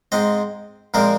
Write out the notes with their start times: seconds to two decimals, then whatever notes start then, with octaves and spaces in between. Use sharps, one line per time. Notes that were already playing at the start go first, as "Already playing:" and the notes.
0.12 G#2 G#3 C4 D#5
0.94 A#2 F3 G#3 C4 A#4